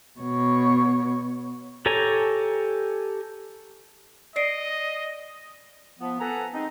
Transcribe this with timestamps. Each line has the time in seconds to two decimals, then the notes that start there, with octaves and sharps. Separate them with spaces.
0.20 B2 C#5
1.86 G4 A4 C#5 G#5 A#5
4.36 D5 D#5 C7 D7
5.98 F3 B3
6.20 A4 B4 F#5 G#5 A#5
6.53 G#3 C4 D#4